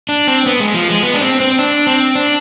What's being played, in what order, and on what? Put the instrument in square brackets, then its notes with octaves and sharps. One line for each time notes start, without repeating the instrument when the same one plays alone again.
[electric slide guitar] D4
C4
B3
G#3
F3
G#3
B3
D4
C4
C4
D4
C4
D4